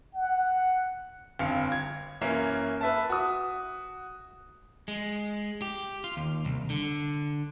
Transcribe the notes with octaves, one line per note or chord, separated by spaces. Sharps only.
F#5
G1 F2 F5 C#7
G#6
F#2 E3 A#3 C#4
B4 E5 A5
F#4 D#6
G#3
G4
F4
D#2
C2
D3